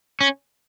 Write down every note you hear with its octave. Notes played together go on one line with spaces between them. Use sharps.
C#4